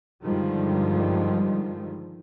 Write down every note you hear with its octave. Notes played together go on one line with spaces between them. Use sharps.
G2 D3 D#3 F3 G3 G#3